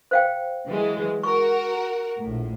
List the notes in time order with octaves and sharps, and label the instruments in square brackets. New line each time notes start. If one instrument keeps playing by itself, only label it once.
[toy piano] C5 F5 G5
[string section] E3 F#3 G#3
[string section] F#4 A#4 [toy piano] C#6
[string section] A#1 A2